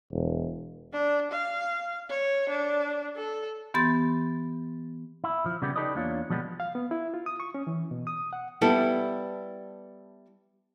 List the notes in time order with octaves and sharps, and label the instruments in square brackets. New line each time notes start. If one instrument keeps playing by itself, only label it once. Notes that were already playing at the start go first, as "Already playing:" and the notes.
[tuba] E1
[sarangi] D4
F5
C#5
D4
A4
[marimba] E3 B3 G4 C6 A6
[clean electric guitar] E4
F3
C#3 G3 B3 G4
D#4 G4 A4 B4 D5 D#5
E2 A#3 D4 F4 C#5
B2 F3 G3 G#3 B3
[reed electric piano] F5
B3
E4
F4
D#6
C#6
C#4
E3
B2
D#6
F#5
[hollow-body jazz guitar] G3 B3 E4 A4